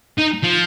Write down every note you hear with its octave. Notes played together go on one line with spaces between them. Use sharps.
D#4
F3